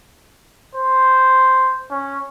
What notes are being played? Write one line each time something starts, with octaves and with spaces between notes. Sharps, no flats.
C5
C#4